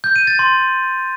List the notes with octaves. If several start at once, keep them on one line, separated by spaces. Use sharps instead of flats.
G6
D#7
A6
C6